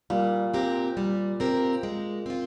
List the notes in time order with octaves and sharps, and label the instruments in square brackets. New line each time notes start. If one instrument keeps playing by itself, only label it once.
[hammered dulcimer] A#2 [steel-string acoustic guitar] G3
[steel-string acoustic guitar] C4 G4 A#4
G3
C4 G4 A#4
G#3
C4 F4